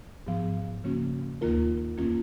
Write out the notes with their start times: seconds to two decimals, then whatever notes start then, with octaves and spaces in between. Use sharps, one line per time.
0.27 G#2 F3 B3
0.84 C#3 F3 A#3 C#4 F#4
1.41 D#2 D#3 A#3 F4 A#4
1.97 F2 D#3 A#3 C#4 F4